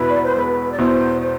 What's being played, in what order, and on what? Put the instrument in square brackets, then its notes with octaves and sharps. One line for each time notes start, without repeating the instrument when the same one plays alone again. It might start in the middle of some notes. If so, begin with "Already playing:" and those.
Already playing: [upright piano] E1 E2 B2 B3 E4 [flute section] B4
[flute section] D5
C5
[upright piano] E1 [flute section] B4
[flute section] D5
[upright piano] E2 B2 B3 E4 [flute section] C5
[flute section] C5